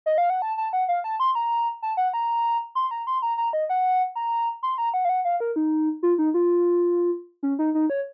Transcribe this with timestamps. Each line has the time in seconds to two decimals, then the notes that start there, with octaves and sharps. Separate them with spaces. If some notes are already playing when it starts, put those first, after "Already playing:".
0.06 D#5
0.18 F5
0.30 F#5
0.42 A5
0.57 A5
0.73 F#5
0.89 F5
1.04 A5
1.20 C6
1.35 A#5
1.82 A5
1.97 F#5
2.14 A#5
2.75 C6
2.91 A#5
3.07 C6
3.22 A#5
3.38 A#5
3.53 D#5
3.69 F#5
4.16 A#5
4.63 C6
4.78 A#5
4.94 F#5
5.05 F5
5.09 F#5
5.25 F5
5.40 A#4
5.56 D#4
6.03 F4
6.18 D#4
6.34 F4
7.43 C#4
7.59 D#4
7.74 D#4
7.90 C#5